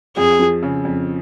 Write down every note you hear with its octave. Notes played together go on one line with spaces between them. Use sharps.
F2 G#4
F3
C#3
F2